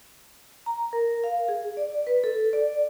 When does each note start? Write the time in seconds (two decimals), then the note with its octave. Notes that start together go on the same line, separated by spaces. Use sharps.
0.66 A#5
0.93 A#4
1.24 F5
1.48 G#4
1.77 D5
2.07 B4
2.24 A4
2.53 D5